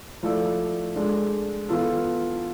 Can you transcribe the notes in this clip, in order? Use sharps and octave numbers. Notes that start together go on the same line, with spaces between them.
F3 A3 E4 A4 D5
G#3 D4 A4 D5
E3 B3 F4 A4